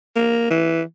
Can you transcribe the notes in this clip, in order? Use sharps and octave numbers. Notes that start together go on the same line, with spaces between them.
A#3
E3